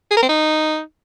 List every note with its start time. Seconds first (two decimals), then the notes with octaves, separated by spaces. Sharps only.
0.11 G#4
0.17 A#4
0.23 C4
0.29 D#4